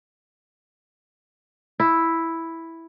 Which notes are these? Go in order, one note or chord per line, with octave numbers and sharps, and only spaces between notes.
E4